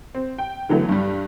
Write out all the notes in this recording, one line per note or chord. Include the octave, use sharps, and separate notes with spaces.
C4
G5
D3 E3 F#3 A3 B3
G2 G3